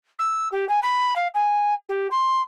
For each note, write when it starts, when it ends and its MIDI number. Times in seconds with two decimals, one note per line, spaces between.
0.19 0.48 88
0.52 0.67 67
0.69 0.79 80
0.82 1.14 83
1.16 1.27 77
1.34 1.74 80
1.89 2.08 67
2.11 2.41 84